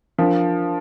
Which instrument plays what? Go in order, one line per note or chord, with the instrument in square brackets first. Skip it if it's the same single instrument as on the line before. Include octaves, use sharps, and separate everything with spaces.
[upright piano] F3 [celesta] D4 F4 A#4 F5